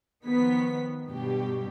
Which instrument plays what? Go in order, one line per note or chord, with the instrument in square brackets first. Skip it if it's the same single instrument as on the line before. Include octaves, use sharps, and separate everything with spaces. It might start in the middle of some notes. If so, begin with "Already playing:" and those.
[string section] D#3 F3 B3 B6
G2 B2 F#3 G4